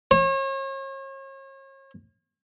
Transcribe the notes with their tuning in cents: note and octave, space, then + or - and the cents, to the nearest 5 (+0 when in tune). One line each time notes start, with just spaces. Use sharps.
C#5 -40